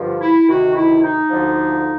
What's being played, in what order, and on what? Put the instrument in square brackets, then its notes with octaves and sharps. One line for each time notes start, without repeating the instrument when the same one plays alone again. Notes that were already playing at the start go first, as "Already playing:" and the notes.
Already playing: [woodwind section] G2 D3 F3
E4
D2 C3 D#3 F#4
E4
D#4
D2 D3 F3